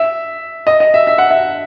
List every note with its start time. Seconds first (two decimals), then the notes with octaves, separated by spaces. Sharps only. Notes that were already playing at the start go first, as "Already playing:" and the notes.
Already playing: E5
0.67 D#5
0.80 D#5
0.94 E5
1.07 E5
1.18 F#5
1.31 E5